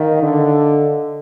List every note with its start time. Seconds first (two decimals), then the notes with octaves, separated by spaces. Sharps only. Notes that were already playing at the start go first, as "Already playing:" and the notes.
Already playing: D#3 D#5 F5
0.22 D3